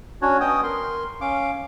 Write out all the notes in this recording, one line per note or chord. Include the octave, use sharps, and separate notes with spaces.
C#4 D4 F#4 C#5
B3 C#4 D#5 G5 D#6
A#4 C6
C#4 F5 D6